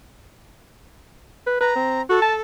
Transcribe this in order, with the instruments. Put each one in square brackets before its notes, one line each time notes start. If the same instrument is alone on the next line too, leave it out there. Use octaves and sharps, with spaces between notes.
[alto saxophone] B4
[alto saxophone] B4 [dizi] A#5
[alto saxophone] C4
[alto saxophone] F#4 [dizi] A4
[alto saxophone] A5